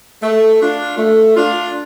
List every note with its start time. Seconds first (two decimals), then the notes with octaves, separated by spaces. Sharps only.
0.23 A3
0.61 D4 F4
0.97 A3
1.34 D4 F4